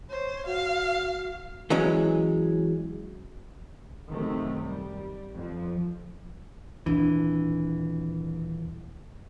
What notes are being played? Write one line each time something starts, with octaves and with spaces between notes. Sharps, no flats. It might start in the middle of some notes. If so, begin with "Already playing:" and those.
C5 C#5
F#4 F5
E3 F#3 G#3 C#4
F#2 C3 D#3 A3
G3
F2 F3
D#1 E3 C4 D4